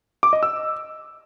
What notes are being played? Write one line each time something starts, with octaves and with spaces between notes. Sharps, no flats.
D6
D#5
E6